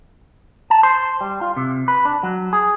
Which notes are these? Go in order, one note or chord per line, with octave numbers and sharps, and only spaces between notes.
A5
C5
G3
F4
C3
B4
D4
F#3
G#4